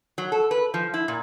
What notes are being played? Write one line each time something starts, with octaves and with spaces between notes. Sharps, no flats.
F#3
A4
B4
F3
E4
A#2